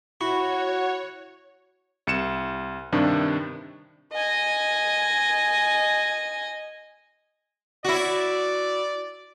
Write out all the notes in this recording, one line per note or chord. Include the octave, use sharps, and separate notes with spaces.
E4 F#4 C#5
C2 C#7 E7
G2 C3 D#3 D4
D#5 G#5
E4 F#4 D5